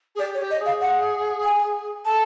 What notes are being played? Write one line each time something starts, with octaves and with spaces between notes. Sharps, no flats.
G#4
G4 D5
C#5
G4
D#5
G#4
F5
F#5
G#5
A4 A5